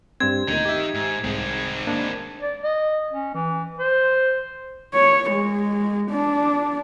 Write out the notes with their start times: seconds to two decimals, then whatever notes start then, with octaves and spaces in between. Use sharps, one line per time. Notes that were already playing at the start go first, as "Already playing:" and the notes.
0.20 G2 G3 C4 G#6
0.48 D2 A#2 D#3 D#4
0.65 G4 E5
0.94 G#2
1.24 C2 G#2 G#3 C4
1.87 A#3 D4
2.41 D5
2.63 D#5
3.12 C#4
3.35 E3
3.79 C5
4.94 C#5
5.31 G#3
6.11 D4